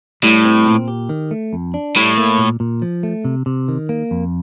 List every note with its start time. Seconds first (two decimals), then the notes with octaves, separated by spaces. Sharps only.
0.23 A2 G3
0.45 C4
0.66 A#2
0.88 G4
1.09 D#3
1.31 A3
1.53 F2
1.74 D4
1.95 A2 G3
2.18 A#3
2.38 A#2
2.60 A#2
2.82 F3
3.03 A3
3.25 C3
3.46 C3
3.68 D#3
3.89 A#3
4.11 F2